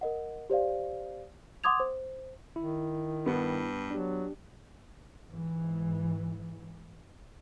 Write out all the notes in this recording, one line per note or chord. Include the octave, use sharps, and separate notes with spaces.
A#4 D#5 F#5
G4 C5 D5 F5
F#5 C6 D6 D#6 G#6 F7
C5
D#3 E4
G2 B3
F#3 D4 G4
G#2 E3